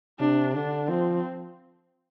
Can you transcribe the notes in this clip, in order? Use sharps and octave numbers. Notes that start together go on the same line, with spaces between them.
C3 D4
D3 D4
F3 C4